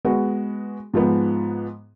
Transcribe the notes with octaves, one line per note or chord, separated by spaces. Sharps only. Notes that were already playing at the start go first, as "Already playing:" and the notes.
G#3 B3 F#4
G#2 F3 G#3 B3